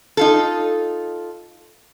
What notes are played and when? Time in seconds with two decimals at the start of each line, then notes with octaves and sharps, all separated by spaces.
0.17 D#4 F4 A4